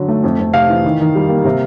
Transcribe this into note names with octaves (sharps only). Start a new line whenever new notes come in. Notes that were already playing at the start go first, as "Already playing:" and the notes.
Already playing: D3 F#3
A3
F2
F2
C3 F5
E3
D#3
D#3
G3
A#3
C3